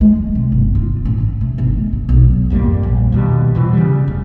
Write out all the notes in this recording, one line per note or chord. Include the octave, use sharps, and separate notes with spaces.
G#3
F#3
C3
G1
F4
A1
A1
C3
G1
G#3
F#3
B1
G#1 F2 G3 A#3
A#1
D#2 B2 G3
B2 E3 F3
C#3 G3
F1